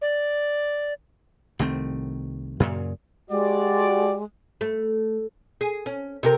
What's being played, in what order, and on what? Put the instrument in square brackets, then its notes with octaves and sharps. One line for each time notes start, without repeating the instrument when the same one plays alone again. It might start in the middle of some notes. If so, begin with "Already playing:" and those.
[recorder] D5
[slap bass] C2 D#3 A3 C4
F#2 A#2 C#3
[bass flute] G#3 [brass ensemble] F#4 G4 D5
[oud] A3
G#4
C#4
C3 G4 A#4